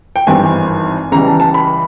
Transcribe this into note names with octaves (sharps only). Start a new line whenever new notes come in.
G5
G#1 G2 E3 G#5
C#2 C#3 E3 G3 A#5
A5
A5
B5